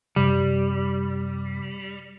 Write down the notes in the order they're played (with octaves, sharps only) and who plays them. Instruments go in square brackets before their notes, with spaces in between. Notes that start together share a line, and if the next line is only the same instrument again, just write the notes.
[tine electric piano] F#2 C3 [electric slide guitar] G3